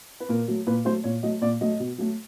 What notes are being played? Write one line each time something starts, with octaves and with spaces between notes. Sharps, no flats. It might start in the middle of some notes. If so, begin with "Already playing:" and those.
B4
A#2 A#4
F#3 A3
A#2 B4
F#3 A3 C5
A#2 C#5
F#3 A3 D#5
A#2 D5
F#3 A3 D#5
B2
F#3 A3